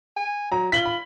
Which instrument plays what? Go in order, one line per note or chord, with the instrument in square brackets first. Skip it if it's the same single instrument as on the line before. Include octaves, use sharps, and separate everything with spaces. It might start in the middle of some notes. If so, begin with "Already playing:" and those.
[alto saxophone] G#5
[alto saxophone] F#3 [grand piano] A#5
[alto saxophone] F4 [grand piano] B6 F#7 G7
[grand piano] B5